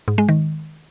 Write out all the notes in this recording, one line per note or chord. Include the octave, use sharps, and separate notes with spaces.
G#2
G#3
D#3